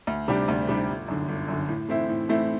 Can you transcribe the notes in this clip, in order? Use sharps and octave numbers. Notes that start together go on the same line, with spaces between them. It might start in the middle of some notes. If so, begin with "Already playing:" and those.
D2
C3 G3 D4 G4
D2
C3 G3 D4 G4
G1
F#2 D3
G1
F#2 D3
A2
E3 A3 C4 E4
A2
E3 A3 C4 E4